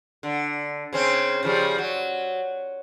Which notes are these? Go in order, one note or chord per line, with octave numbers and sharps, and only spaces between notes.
D3
C#3 C4 C#4
C#3 F3 G3
F#3